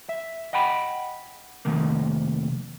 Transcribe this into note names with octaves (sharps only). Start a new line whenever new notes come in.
E5
D#5 F#5 G5 B5
F2 G#2 C3 D#3 A3 A#3